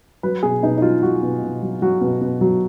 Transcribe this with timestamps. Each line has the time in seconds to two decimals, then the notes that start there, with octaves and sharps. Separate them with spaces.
0.23 F#3 B4
0.43 B2 G#4
0.63 B2 D#4
0.78 D#4
0.82 F#3 F4
1.03 F#3 F#4
1.23 B2
1.42 B2
1.62 F#3
1.82 F#3 F#4
2.01 B2
2.21 B2
2.41 F#3